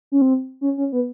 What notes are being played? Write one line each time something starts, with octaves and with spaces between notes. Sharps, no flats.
C#4
C4
C#4
C#4
B3